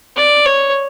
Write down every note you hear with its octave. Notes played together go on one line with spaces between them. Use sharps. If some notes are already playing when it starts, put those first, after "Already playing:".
D5
C#5